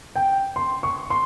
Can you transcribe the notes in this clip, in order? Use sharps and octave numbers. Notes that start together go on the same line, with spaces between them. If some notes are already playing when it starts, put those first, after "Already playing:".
G5
C6
C#6
C6